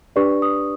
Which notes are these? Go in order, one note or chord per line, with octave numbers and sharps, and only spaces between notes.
D4 G4 B4 D5 C#6
D#6